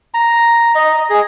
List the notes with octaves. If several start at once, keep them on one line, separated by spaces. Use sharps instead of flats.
A#5
D#5
D#5
G#4